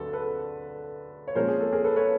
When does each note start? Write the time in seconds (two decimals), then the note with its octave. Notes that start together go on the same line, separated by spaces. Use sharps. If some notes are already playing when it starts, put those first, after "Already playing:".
Already playing: D2 D3 F#3 A4 B4
0.13 A4 B4
1.28 C#5
1.35 A#2 F3 G#3 C#4 A#4 C5
1.48 G#4
1.61 A4
1.72 G#4 A#4
1.84 A4 B4
1.96 B4 C#5